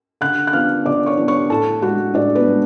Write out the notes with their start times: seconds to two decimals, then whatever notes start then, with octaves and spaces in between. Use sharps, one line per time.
0.21 D3 F#5 F#6
0.47 F#6
0.53 F3 B3 D4 F5 F6
0.86 D3 D5 D6
1.06 C#5 C#6
1.17 F3 B3 D4
1.28 C#5 C#6
1.49 A2 A4 A5
1.82 G#3 D4 F#4 F#5
2.14 A2 D4 D5
2.35 B3 B4
2.47 G#3 D4